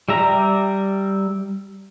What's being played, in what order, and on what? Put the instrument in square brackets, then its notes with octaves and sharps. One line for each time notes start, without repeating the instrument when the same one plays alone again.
[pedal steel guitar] G3 E5 A#5